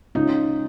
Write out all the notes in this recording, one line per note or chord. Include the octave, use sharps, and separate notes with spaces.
C#3 G#3 C#4 D#4 F4